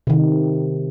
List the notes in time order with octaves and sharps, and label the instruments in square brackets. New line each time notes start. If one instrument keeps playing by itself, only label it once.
[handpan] C3 D#3